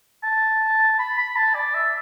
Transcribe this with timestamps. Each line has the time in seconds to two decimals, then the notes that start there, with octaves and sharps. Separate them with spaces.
0.23 A5
0.99 B5
1.18 B5
1.36 A5
1.55 D5
1.74 E5